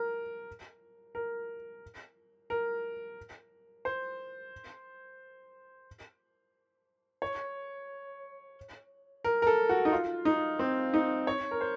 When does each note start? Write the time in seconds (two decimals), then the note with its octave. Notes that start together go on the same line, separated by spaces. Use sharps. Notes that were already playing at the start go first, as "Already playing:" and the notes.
Already playing: A#4
1.15 A#4
2.50 A#4
3.85 C5
7.22 C#5
9.24 A#4
9.42 A#4
9.47 A4
9.69 F#4
9.85 D#4
9.92 F4
10.25 D#4
10.59 C4
10.94 D#4
11.27 C#5
11.51 A#4
11.61 C5